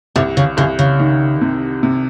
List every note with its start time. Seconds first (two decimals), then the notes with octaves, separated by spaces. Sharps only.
0.16 C2 C3
0.37 C#3
0.57 C2 C#3
0.79 C#3
1.00 D#3
1.41 C3
1.83 C3